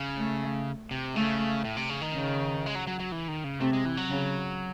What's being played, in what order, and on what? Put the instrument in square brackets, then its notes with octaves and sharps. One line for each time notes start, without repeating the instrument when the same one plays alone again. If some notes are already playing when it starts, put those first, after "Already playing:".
Already playing: [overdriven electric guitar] C#3
[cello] A3
[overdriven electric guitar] C3
[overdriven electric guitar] C#3 [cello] A3
[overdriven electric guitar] A2
C3
C#3
D#3
[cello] C#3
[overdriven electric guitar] G#3
F#3
F#3
F#3
E3
D#3
C#3
[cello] C3 [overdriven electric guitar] A3
[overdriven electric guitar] G#3
E3
F#3
[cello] C#3